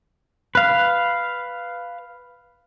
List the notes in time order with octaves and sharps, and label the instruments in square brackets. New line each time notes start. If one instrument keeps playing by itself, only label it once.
[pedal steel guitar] B4 F5